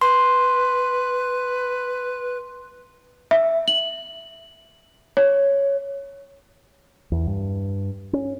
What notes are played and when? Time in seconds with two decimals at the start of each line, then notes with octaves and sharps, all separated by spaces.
0.01 B4 C6
3.31 E5
3.68 F#7
5.17 C#5
7.12 E2
7.27 G2
8.13 C#4